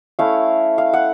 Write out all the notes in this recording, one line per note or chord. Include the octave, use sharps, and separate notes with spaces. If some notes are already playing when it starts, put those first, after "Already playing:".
A3 C#4 E4 F5
F5
F#5